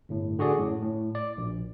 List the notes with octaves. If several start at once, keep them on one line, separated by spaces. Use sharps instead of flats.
G1 A2
D3 F#4 G#4 D5
F#2 A2
A2
D5
A#1